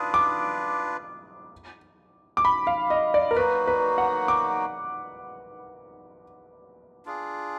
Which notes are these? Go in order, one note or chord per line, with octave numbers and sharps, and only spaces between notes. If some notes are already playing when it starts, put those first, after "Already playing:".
Already playing: D4 F4 B4 D#6
D6
D6
B5
F5
D#5
D5
A#4
F#3 A#3 D#4 F#4 B4
B4
F#5
D6
D4 F4 G#4